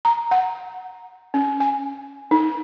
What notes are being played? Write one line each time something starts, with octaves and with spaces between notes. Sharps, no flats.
A#5
F#5
C#4
G#5
D#4